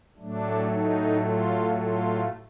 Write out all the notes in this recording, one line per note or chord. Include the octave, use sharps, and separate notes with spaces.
A2 F#3 A3 D4
D#4
F4
F4